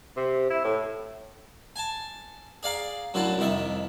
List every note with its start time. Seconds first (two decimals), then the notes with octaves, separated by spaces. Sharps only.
0.16 C3
0.50 E4
0.64 A2
1.76 G#5 A5
2.63 G#4 D5 F5 A#5
3.14 F#2 A2 D3 F#3 A5
3.38 C2 F2 D#3 E5